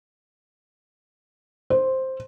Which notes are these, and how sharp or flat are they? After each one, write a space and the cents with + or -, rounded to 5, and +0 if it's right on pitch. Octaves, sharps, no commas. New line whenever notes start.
C5 +5